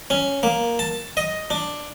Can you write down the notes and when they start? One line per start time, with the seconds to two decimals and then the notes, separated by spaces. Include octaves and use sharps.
0.10 C#4
0.43 A#3
0.79 A5
1.17 D#5
1.50 D4